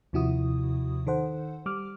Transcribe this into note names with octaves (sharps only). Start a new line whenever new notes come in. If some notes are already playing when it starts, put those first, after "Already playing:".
D#2 C3 F3 E4 F#4 D#6
D#3 A4 C5 F#5
G3 D6 F6